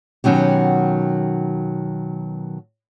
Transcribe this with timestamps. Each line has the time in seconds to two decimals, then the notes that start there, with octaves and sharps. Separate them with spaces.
0.24 B2 D#3 F#3 C#4 G4